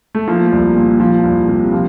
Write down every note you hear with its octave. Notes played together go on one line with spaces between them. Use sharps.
A3
F3 A#3
C2
A#2
F3
C2
C3
F3 A#3